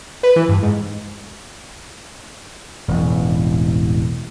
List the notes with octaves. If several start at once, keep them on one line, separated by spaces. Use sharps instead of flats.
B4
E3
G2
G#2
E1 A1